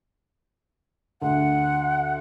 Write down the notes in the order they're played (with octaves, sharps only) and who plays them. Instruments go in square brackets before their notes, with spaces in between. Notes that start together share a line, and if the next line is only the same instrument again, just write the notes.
[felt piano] D2 [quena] F#5